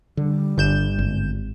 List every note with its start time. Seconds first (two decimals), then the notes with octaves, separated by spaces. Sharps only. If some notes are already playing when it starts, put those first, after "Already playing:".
0.17 D3 G3
0.58 G1 D3 G6 E7
0.99 G#1